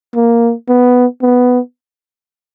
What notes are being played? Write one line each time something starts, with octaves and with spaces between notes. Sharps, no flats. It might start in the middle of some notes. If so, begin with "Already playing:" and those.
A#3
B3
B3